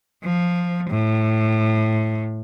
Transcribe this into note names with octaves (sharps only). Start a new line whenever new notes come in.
F3
A2